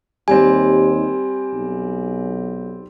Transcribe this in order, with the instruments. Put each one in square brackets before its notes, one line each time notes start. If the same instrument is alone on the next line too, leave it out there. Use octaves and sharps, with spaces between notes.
[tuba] D#2 [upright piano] G3 C4 [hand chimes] G#5
[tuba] B1